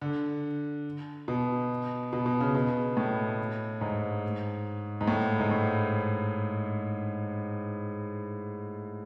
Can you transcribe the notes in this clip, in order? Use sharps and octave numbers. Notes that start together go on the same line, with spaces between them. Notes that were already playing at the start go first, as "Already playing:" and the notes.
D3
B2
B2
B2
C#3
B2
A2
G#2
G#2
A2
G#2
A2